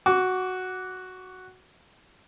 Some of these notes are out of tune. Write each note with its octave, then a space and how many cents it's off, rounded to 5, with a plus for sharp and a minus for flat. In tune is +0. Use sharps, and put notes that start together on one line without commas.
F#4 +0 D6 -25